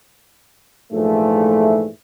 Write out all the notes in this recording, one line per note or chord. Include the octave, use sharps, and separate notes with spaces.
A#1 G#2 E3 F3 A3